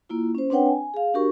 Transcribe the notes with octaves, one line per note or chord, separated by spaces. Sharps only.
A#3 E4 F4
C#4 C5
C4 D4 B4 C#5 F#5 G5
G#5
G#4 F5
D4 F#4 G4 A#4 C#6